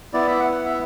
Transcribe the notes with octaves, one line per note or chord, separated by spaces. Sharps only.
B3 E4 D5
E5
F#5
F#5
E5